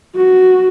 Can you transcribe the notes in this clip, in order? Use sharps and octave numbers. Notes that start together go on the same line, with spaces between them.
F#4